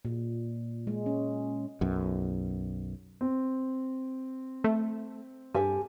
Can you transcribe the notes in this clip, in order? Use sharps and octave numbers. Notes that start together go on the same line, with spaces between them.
A#2
G#3
C#4
B1 F#2
C4
A3
G2 G4 A4 G#5